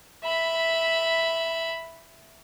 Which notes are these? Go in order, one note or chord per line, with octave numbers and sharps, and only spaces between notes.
E5 B5